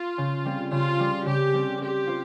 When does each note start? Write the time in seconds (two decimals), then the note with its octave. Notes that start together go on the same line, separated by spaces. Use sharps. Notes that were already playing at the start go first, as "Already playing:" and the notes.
Already playing: F4
0.18 C#3
0.45 G3 C4
0.71 C#3 F4
0.99 G3 C4
1.26 C#3 G4
1.54 G3 C4
1.81 C4 G4
2.07 F4 C5